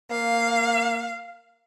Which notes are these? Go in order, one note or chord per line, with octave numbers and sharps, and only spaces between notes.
A#3 F5